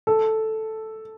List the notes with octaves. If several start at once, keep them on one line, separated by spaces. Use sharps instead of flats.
A4